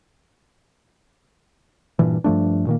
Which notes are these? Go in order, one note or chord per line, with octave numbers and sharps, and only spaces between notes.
G2 A#2 E3
G2 F3 A3 D4
A#2 D#3 A#3